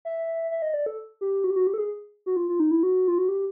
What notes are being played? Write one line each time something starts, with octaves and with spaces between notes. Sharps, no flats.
E5
E5
D#5
D5
A4
G4
F#4
G4
F#4
G4
A4
G#4
F#4
F4
F4
D#4
E4
F#4
F4
F#4
G4